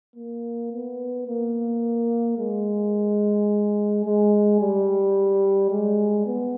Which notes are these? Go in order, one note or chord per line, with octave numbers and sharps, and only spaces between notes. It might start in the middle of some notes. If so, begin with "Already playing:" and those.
A#3
B3
A#3
G#3
G#3
G3
G#3
B3